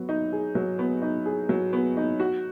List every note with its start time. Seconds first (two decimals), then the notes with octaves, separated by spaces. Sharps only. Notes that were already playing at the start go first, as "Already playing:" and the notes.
Already playing: F#3 B3
0.09 D#4
0.32 G#4
0.55 F#3
0.79 B3
1.02 D#4
1.25 G#4
1.49 F#3
1.73 B3
1.97 D#4
2.20 F#4